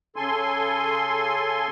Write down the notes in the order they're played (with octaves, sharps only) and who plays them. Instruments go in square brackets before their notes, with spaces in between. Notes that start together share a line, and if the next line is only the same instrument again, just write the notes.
[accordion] C#3 A4 G#5 C6